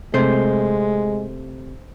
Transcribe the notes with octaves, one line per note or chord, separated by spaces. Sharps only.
C3 G#3 A3 C5